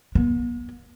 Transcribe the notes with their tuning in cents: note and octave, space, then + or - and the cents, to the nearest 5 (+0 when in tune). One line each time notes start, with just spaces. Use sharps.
B3 -45